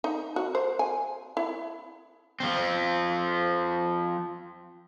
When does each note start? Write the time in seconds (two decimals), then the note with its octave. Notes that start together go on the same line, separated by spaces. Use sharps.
0.04 D#4
0.36 F#4
0.55 C5
0.79 G#5
1.37 E4
2.40 F3 C4